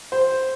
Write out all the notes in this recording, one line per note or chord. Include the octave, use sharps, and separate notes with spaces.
C5